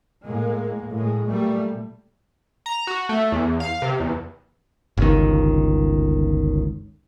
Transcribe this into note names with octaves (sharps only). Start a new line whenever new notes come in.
A2 G#3 A#3
A2 G#3
A#2 G3 A3
A#5
F#4
A3
E2
F5
C3
E2
G1 C#2 D#3